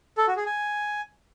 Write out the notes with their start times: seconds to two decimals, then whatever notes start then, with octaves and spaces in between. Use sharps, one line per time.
0.18 A4
0.27 F#4
0.37 G#4
0.46 G#5